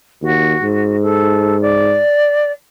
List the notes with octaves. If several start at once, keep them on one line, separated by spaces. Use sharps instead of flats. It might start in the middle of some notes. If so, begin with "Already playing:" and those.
D#2 F#4
G#2
A4
D5